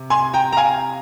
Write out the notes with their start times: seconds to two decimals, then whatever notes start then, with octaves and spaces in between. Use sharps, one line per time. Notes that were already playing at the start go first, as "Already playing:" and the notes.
Already playing: C3
0.10 G#5 C6
0.33 G5 A#5
0.53 A#5
0.57 F5 G#5